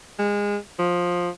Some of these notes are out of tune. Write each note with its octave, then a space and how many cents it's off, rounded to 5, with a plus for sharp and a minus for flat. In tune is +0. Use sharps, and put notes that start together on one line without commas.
G#3 -25
F3 +15